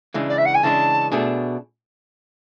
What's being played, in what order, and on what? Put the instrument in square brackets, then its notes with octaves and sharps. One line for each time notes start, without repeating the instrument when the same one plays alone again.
[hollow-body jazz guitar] C#3 E3 G#3 D4
[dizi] D5
E5
F#5
G#5
[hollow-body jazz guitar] C#3 E3 G#3 D4 [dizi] A5
[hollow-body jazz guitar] B2 A3 D4 G#4